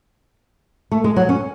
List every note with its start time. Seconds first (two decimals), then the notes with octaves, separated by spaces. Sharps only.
0.91 A3
1.04 G#3
1.16 F#3
1.29 C#4